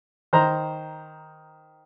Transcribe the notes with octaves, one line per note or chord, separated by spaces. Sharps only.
D#3 C5 A#5